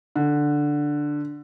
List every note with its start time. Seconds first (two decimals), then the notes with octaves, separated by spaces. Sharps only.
0.16 D3